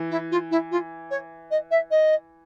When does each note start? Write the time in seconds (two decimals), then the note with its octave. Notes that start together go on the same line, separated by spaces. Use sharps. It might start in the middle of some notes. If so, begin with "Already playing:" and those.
Already playing: E3
0.10 E4
0.31 F4
0.50 E4
0.71 F4
1.10 C#5
1.50 D#5
1.70 E5
1.90 D#5